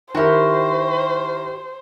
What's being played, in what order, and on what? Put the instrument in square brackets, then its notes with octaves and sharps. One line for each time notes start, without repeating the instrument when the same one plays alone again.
[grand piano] D#3 E4 A#4 [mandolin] F#4 G4 [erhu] C5